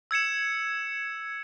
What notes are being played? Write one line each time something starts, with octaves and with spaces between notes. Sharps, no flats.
E6 G#6 C#7 E7